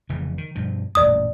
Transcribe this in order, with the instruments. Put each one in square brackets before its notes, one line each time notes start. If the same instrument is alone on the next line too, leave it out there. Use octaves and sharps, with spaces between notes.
[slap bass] F1 C#3 E3
D#3
G2 B2 F3
[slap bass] D#1 A1 F#2 [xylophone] D5 D#6